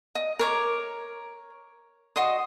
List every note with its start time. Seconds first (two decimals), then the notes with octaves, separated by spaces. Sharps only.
0.15 D#5
0.39 A#4 C#5 D6
2.16 F#4 D#5 C6 D#6